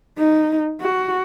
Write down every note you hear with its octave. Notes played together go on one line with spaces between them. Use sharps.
D#4
F#4